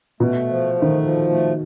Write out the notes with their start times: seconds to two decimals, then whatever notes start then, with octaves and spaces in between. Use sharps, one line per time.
0.20 B2 A3
0.48 F3
0.74 A3
0.82 D#3
1.02 F3
1.29 A3